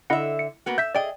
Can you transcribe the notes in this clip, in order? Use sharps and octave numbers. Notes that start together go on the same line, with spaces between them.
D3 E4 D#5 E5 F#5
C#7
A#3 B3 F#4
E5 G6 B6
G#4 D5 D#5 G5